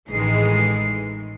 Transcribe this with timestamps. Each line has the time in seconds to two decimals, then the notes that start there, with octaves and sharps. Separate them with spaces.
0.11 A1 D#3 E3 G#3 C7